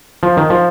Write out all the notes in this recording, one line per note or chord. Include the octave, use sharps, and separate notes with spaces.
F3
D#3
F3